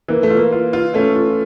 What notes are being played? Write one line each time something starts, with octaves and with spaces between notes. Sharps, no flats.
E3 A#3
A3
F4
A#3
F4
F4
A3 C#4
F4